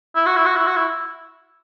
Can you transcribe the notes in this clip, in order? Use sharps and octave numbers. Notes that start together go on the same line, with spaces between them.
E4
F#4
E4
F#4
E4
F#4
E4